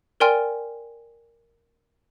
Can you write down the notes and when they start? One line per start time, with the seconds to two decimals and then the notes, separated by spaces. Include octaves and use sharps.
0.20 A#4 D5 G5 G#5 C6 F6